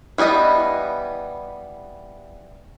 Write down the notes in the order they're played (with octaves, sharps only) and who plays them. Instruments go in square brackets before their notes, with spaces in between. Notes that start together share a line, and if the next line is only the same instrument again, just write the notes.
[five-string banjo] E3 G3 B3 D#5